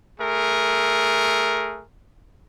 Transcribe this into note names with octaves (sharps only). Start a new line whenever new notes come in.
A3 G#4 A#4